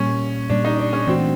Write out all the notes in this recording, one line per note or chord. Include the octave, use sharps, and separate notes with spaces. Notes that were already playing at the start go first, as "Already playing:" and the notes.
Already playing: A#2 G3 A#3 C#4
A#2 G3 A#3 D4
D#4
D4
C#4
E3 A3 C4 D4 F#4